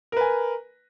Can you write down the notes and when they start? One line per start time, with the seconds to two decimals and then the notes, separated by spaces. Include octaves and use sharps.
0.12 A#4
0.17 B4
0.21 G#5